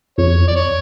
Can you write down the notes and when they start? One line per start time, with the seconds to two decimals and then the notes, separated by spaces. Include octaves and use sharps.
0.18 F2 C#5
0.43 E2 D5
0.56 C#5